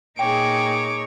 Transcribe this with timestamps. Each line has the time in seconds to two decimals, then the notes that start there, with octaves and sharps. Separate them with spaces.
0.19 A#2 D#4 G#4 C#5 G5 D6